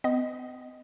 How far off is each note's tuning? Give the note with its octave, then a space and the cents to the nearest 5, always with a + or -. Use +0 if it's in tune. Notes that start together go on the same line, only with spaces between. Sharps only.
B3 +40 D#5 +0